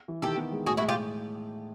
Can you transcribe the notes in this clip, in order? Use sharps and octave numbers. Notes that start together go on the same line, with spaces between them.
E3
D#3 G4 A4
B3
G#3
A2 F#4 G#4
E4 F#4
G#3
F4 G4